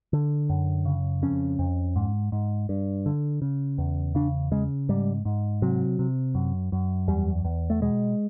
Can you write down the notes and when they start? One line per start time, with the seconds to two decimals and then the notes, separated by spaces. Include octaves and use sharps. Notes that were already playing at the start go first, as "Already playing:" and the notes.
0.13 D3
0.49 F#2
0.85 C#3
1.22 F2 C#4
1.59 F2
1.96 G#2
2.32 G#2
2.69 G2
3.06 D3
3.42 C#3
3.78 E2
4.15 C#3 D4
4.51 C#3 G#3
4.89 G#2 G3
5.25 G#2
5.62 C3 F#3
5.99 C3
6.35 F#2
6.72 F#2
7.08 E2 G3
7.45 E2
7.70 A3
7.82 B2 G#3